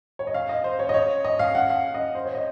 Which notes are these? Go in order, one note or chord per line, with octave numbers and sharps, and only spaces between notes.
C#5
D#5
F5
D#5
C5
C#5
D#5
C#5
D#5
F5
F#5
F5
D#5
C5
C#5
D#5